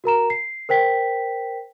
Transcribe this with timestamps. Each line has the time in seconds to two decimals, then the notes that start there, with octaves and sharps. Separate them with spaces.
0.04 F#4 A#4 A#5 E7
0.30 C7
0.69 A#4 C5 G5 B6